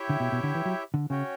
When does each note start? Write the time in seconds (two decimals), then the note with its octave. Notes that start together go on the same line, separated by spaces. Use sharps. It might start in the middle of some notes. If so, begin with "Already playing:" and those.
Already playing: E4 G4 C#5 E5 G5
0.09 D3
0.20 B2
0.32 B2
0.43 D3
0.55 E3
0.65 F#3
0.94 D3
1.10 C#3 C#4 F#4 C#5 G5